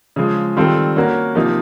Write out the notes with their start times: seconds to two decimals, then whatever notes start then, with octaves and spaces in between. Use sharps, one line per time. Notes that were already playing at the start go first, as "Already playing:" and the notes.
0.16 C#3 F3 G#3
0.56 D#3 G3 C4 F4 A4
0.96 A#3 C#4 F#4 A#4
1.35 C3 F3 A#3 D#4